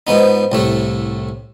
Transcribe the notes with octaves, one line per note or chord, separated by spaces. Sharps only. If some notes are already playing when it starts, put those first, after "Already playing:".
G#2 F3 B3 D#4
C2 A2 A3